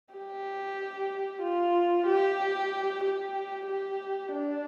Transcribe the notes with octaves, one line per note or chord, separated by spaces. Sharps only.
G4
F4
G4
G4
G4
D4